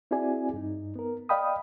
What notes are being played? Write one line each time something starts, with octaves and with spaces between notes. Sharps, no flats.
C4 E4 F#4 G#4 D5 G#5
G2 D#4
B3 A#4
D5 D#5 F5 G5 B5 D#6